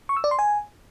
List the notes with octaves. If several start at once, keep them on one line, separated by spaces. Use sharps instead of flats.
C#6
E6
D5
C6
G#5